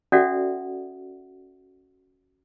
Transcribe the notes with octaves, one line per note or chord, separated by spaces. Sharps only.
C#4 F#4 A4 D5 E5 F#5